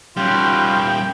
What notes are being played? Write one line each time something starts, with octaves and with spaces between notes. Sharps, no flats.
B2 G3 C#4 F4 G5